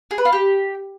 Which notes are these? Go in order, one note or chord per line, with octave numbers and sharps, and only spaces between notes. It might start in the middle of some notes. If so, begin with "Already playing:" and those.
G#4
B4
F4
G4